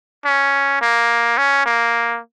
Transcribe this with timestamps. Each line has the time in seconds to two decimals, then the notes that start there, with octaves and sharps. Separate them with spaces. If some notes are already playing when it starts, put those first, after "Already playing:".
0.25 C#4
0.81 A#3
1.38 C#4
1.66 A#3